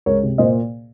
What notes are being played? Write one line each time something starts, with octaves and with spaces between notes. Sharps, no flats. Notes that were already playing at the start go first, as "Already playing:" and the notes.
C#2 A#4 C#5
C3
A#2 C5 D#5